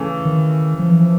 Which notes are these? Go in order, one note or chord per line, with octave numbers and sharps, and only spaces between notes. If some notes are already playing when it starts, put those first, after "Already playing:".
Already playing: C#3 E3 A3
D#3
F3
E3
F3